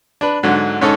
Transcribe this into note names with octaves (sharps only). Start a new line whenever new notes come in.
D4 B4
G#2 D3 F#3
G#2 C#4 D#4 A4